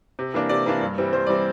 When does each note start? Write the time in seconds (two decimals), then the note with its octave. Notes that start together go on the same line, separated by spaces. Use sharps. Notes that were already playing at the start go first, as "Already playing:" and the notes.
0.19 C3
0.34 E3 A#3 D4
0.49 C3 D5
0.66 E3 A#3 D4
0.81 G2
0.98 E3 G3 C4
1.13 G2 C5
1.27 E3 G3 C4 D5